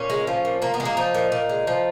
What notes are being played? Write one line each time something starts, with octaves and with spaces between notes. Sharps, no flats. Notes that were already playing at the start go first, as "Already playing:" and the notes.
Already playing: A#2 C#4
G#3
F3
A#2
A#2 A#3
B3
G#3
A#3
F3 D#4
A#2
A#2
G#3
F3